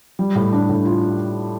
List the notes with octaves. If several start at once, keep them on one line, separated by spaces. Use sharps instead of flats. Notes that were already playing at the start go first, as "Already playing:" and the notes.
G3
A2
D4
A2
F4